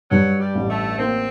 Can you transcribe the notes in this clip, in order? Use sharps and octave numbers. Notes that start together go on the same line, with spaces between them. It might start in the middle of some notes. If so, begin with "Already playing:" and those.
G2 F#3
G3
A1
A3
A#3 C4